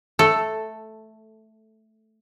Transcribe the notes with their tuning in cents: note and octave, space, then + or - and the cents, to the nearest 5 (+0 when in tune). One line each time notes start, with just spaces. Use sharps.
A3 -5 A4 +5